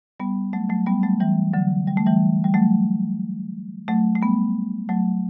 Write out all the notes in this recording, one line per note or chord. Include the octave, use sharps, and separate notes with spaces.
G3 B3
F#3 A3
F#3 A3
G3 B3
F#3 A3
E3 G3
D3 F#3
G3
A3
E3 G3
G3
F#3 A3
F#3 A3
A3
G3 B3
F#3 A3